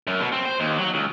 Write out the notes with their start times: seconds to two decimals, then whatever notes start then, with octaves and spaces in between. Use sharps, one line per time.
0.07 F#2
0.21 B2
0.32 C4
0.45 C5
0.60 D#2
0.78 F#3
0.94 C#2